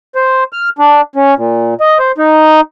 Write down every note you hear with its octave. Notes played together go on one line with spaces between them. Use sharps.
C5
F6
D4
C#4
A#2
D#5
C5
D#4